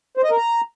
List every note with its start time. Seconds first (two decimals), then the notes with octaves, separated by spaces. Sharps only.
0.17 C5
0.24 D#5
0.30 A#4
0.37 A#5